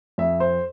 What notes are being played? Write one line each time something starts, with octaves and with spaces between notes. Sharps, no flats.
F2 E5
C5